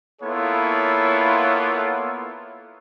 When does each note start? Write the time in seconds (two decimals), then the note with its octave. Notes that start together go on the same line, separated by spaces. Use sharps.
0.22 A#3 B3 E4 F4 A4 C#5